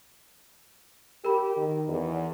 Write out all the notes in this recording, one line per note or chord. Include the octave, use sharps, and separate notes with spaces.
G4 A#4 B5
D#3
E2